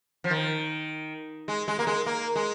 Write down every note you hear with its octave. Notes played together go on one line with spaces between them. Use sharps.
F3
D#3
G#3
G#3
A#3
G#3
A#3
G#3